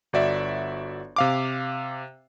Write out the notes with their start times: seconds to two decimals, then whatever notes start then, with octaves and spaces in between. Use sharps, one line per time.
0.13 G1 F#4 D5 E5
1.16 C3 F5 D6